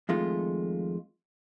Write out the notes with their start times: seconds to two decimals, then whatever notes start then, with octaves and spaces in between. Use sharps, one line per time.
0.09 F2 D#3 G#3 A3 F4